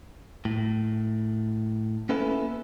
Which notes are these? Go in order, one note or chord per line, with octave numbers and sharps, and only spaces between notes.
A2
A#3 B3 C#4 E4 A4 B4